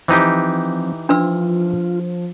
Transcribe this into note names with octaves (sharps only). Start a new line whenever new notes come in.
E3 F3 C4 D#4 G4
F3 D4 F4 B4 E6